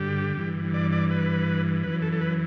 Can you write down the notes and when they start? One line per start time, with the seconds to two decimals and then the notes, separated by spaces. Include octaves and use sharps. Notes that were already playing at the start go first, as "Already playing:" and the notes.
Already playing: G2 D3 G4
0.37 G2 E3
0.74 D5
0.92 D5
1.11 B4
1.83 F#2 E3 B4
2.02 A4
2.12 A4
2.21 B4